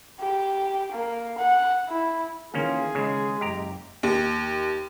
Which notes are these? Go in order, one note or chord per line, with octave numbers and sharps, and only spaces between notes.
G4
A#3
F#5
E4
D#3 E3 A#3 C#4 F4 G#4
C#3 G#3
F#1 G4 A#5 D7
D#2